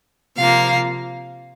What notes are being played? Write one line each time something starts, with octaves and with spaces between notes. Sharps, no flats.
C3 F3 A#3 F5